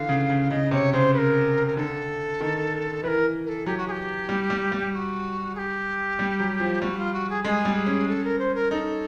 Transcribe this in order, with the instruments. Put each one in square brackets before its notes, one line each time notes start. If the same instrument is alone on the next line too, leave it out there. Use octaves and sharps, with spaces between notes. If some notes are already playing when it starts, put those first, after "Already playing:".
Already playing: [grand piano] D3 E3 [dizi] F5
[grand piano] C#3
C#3
[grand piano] C#3 [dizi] D#5
[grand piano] C3 [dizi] C#5
[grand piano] C#3 [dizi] C5
[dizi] B4
A#4
A#4
[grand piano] D3 [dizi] A4
[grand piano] D#3
[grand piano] E3 [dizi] A#4 B4
[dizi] A#4
A4
[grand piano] F#3 [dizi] G4
[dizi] F#4
G#4
G4
[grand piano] G3
G3
G3
[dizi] G4
F#4
G#4
G4
[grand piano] G3
F#3
F3
[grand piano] G3 [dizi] F#4
[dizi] F4
F#4
G#4
[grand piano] G#3 [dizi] G#4 A4
[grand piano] G3
[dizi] G#4
[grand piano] C#4
[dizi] A4
A#4
C5
A#4
[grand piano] D#4 [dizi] A4